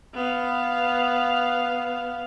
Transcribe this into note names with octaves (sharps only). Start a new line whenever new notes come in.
B3 F5